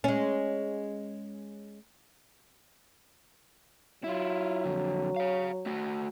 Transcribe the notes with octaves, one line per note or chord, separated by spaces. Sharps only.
G#3 C#4
F#3 E4 F4
F2 D3
C#5 F5
A3 F#4